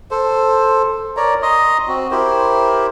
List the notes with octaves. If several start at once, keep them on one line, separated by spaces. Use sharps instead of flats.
A4 C5
A#4 C#5 D5 A#5
D#5 A#5 C6 D#6
C4 F#4
E4 G4 A#4 C5